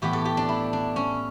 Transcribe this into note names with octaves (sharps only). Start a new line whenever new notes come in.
A2 E3 B3 G4
A4
G4
D4
E4
D4
C#4